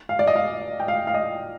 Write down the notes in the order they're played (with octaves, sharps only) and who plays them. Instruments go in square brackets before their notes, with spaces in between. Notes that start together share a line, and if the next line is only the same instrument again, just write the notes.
[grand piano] F5
D5
D#5
F5
G5
F5
F5
D#5